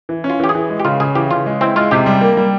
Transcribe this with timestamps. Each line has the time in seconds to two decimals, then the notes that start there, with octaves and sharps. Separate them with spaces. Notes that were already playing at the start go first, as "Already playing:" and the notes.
0.09 E3
0.24 C#4
0.30 F4
0.40 E3 G4
0.49 G#4
0.55 E3
0.70 G#3
0.80 G4
0.85 C#3 F4
1.00 C#3 G#4
1.15 E3 G4
1.31 C#3 F4
1.46 G#3
1.61 C4 E4
1.76 G#3 F4
1.91 C3 G4
2.06 G3
2.21 A#3
2.37 G3